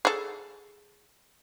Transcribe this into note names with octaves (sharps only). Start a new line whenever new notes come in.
G#4 A4